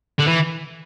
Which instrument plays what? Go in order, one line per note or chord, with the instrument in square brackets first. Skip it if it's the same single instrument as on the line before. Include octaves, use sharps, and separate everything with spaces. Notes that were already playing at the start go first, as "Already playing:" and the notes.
[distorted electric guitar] D3
E3